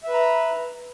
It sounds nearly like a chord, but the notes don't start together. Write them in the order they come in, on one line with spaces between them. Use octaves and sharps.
E5 B4 A#5